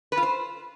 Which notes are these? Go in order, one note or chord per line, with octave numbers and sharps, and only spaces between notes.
B4
F4
C5